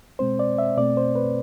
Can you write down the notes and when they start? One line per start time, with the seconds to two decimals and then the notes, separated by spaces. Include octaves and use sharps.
0.19 B2 G#3 C4 C5
0.39 D5
0.58 E5
0.78 B2 A3 C4 D5
0.97 C5
1.15 B4